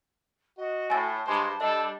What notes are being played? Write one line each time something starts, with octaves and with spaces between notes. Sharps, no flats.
F#4 D#5
A2 G#5 A5 A6
G2 G#3 C5
G3 D4 A4 D#5